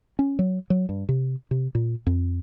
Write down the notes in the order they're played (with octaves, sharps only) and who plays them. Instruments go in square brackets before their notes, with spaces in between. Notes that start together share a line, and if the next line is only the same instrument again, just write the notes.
[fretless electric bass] C#4
F#3
F#3
G2
C3
C3
A#2
F2